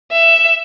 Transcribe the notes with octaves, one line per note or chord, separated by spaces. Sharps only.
E5